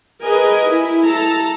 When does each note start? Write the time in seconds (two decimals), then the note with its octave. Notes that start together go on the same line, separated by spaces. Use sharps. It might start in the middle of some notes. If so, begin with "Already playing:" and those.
0.22 G#4 A#4 B4 D#5 G#5
0.63 E4
1.05 A4 A5 A#5